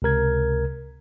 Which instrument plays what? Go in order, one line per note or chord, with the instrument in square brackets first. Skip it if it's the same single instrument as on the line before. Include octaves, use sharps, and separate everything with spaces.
[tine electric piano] C#2 C3 A#4 G#6